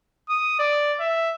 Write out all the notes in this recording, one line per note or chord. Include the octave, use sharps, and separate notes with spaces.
D#6
D5
E5